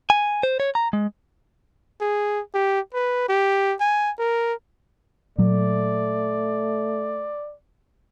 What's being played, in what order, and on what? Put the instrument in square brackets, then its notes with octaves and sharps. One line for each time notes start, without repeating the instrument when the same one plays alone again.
[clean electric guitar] G#5
C5
C#5
A#5
G#3
[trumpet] G#4
G4
B4
G4
G#5
A#4
[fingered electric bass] A#2 F#3 [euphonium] A3 [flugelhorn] D5